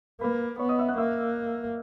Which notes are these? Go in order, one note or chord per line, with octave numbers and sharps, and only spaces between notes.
A#3 B4 B5
B3 C#5 C#6
D#5 D#6
E5 E6
F#5 F#6
A#3 E5 E6